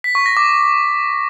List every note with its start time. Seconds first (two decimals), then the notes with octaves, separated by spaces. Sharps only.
0.04 B6
0.15 C#6
0.26 A#6
0.37 D6